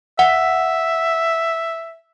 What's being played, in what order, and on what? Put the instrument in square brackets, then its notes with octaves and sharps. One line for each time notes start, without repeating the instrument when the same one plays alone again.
[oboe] E5 [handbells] F#5